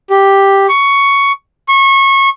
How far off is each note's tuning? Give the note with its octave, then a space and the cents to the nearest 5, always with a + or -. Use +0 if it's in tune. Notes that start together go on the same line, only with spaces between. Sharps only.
G4 +0
C#6 +10
C#6 -25